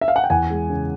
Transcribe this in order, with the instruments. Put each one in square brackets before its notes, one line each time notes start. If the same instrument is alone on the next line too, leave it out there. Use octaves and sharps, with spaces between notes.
[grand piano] E5
F5
F#5
G5
E2 F#5 G#5
G#3
C#3